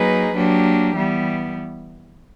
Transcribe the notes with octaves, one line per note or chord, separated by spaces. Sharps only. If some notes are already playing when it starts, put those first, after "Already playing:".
Already playing: F#3 A#3 D#4 G#4 B4
F#3 A#3 D4 G4
E3 G3 B3